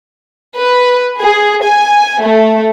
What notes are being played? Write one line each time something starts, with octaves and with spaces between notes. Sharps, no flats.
B4
G#4
G#5
A3